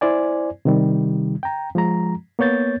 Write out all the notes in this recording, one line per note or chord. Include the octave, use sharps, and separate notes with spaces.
E4 C5 D5 G#5
C3 D#3 G3
G5 A#5
F3 G#3 A#5
A#3 B3 C#5 G6 A6